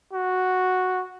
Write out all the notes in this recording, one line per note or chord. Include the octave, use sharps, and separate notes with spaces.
F#4